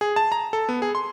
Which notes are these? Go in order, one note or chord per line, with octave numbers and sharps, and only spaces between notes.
G#4
A5
A#5
A4
B3
G#4
C6